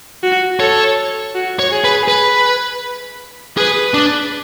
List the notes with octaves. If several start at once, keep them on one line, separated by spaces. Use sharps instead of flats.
F#4
A4 C#5
F#4
C#5
G#4
B4
B4
G#4 B4
D4